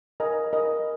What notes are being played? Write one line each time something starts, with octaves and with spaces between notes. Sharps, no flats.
A#4 D#5 G#5 B5
A#4 D#5 G#5 B5